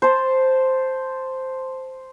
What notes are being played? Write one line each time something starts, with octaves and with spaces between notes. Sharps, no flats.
C5 A5